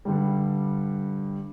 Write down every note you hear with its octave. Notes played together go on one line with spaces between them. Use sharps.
G2 D3 G3